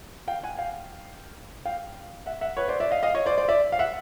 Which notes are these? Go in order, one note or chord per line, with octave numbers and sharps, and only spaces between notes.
F5 G5
F#5 G#5
F5 G5
F5 G5
E5 F#5
E5 F#5
B4 C#5
C5 D5
D5 E5
D#5 F5
D#5 F5
C#5 D#5
C5 D5
C5 D5
D5 E5
F5
E5 F#5